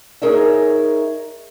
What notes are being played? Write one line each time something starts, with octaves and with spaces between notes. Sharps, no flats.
D#4 G#4 A#4 C#5 D#5 E5